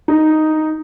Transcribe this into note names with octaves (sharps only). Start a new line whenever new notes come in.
D#4